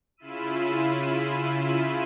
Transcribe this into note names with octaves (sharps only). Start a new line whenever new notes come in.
C#3 E4 F4 B5 E6 D#7